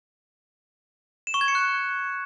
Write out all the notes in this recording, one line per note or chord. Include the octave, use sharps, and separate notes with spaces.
E7
C#6
G#6
C#7
F#6